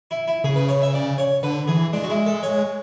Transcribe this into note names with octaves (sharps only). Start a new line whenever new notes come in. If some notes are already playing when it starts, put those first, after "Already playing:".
E4
E4
C#3 G#4
B4
C#5
E5
D5
C#5
D3 B4
E3 G#4
G#3 D4
F#4
E4
A4
C#5